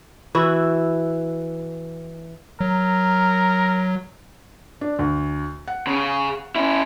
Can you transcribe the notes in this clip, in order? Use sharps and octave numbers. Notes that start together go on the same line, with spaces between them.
E3 E4 F#4
F#3 A#4
D4
D2
F#5
C#3 C#4
C#4 E4